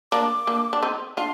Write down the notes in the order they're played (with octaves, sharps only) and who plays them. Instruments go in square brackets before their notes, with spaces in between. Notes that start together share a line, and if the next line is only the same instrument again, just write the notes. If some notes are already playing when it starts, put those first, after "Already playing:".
[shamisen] A#3 D4 [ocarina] D6
[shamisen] A#3 D4
D4
C4 D#4
[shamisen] D4 F4 [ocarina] C6